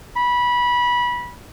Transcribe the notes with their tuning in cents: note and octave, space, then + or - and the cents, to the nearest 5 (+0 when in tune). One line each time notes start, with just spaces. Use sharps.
B5 -20